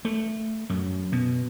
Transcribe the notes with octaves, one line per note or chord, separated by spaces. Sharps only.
A3
F#2
B2